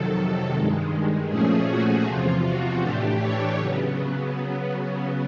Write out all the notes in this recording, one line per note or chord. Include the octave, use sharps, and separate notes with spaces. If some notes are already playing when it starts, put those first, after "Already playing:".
Already playing: F2 C3 D#3 F#3 A4
G2 D#3 G#3
A#2 F3 A3 C#4 G#4
F#4
E2 C3 F3 F4
F#4
A2 E3 A3 D4 G4
C#5
C#3 F#3 B3